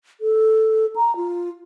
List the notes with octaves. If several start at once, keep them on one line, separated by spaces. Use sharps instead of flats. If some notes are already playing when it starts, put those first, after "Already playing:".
A4
A#5
F4